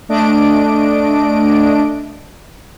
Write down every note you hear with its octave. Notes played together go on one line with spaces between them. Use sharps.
A3 D4 D#5 D7